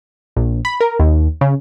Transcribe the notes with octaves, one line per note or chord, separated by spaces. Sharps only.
A#1
B5
A#4
D#2
C#3